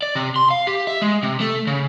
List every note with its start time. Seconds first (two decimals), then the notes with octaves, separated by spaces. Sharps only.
0.02 D5
0.15 C3
0.36 C6
0.50 F5
0.67 G4
0.87 E5
1.02 G#3
1.23 C3
1.40 A3
1.67 C#3